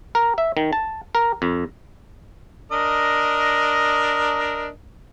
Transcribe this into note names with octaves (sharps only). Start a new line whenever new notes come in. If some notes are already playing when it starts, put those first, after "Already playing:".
A#4
E5
D#3
A5
A#4
F2
D4 A#4 D#5